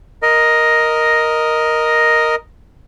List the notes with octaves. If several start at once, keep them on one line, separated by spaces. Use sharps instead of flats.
A#4 D#5